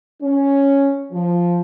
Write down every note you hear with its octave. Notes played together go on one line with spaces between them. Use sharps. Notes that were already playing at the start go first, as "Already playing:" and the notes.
C#4
F3